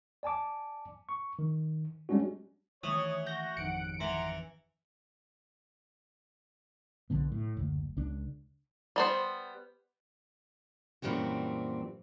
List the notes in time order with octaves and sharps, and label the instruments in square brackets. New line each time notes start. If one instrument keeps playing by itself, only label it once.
[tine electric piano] D5 G#5 A5 D6
C#6
D#3
G3 G#3 C#4 D4 F#4
[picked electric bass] D#3 A3 [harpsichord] E3 [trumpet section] C#5 [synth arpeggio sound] D#6
[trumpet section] F#4 [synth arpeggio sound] G6 A#6
[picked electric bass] G#1 F2 D#3 [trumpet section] F#5 [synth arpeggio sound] C#7 D7
[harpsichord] E3 [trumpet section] F#5 A#5 C6
[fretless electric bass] B1 D3 B3
A2
F#1 D2
C#2 D4
[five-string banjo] G3 B3 C5
[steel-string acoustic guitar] F#2 A#2 E3 G3 C4 F#4